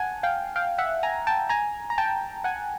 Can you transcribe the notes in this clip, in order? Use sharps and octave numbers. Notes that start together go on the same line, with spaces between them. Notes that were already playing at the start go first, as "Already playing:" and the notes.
Already playing: F#5 G#5 A5
F5 G5
F5 G5
E5 F#5
G#5 A#5
G5 A5
G#5 A#5
A#5
G5 A5
F#5 G#5